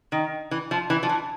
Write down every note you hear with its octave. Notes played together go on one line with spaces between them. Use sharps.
D#3
E3
F3
E3
F3
E3